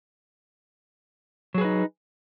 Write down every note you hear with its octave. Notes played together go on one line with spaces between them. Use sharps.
F#3 D#4 G#4 B4